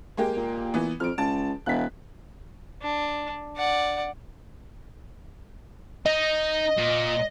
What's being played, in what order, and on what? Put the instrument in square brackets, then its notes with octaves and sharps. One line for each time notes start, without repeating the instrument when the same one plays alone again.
[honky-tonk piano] G#3 A#3 G4
[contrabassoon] A#2
[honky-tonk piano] E3 B3
[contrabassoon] F2 [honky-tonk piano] F6 D7
[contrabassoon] C#2 [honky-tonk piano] A5
[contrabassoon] E1 [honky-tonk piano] F#6 B6
[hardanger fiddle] D4
D5 F#5
[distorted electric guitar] D#4 [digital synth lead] D#5
[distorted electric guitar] A#2